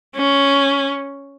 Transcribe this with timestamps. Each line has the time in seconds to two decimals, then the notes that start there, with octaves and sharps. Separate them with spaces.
0.15 C#4